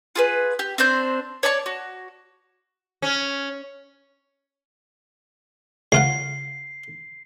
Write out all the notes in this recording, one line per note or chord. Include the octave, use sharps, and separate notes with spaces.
F4 G#4 B4
G4
C4 D4 C5 G6
C#5 D5 A5 C#6
F#4
C#4
C#2 F4 F#5 C7